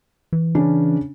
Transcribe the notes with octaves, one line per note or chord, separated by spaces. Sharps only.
E3
C#3 C#4 D4